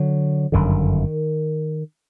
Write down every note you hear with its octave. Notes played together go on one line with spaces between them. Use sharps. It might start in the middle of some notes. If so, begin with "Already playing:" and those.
Already playing: D3 F#3
G1 F#2 D3 D#3